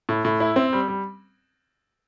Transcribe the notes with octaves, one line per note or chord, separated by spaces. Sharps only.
A2
A2
E4
C4
G3
G3